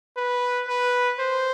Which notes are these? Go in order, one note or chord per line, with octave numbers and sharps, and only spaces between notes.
B4
B4
C5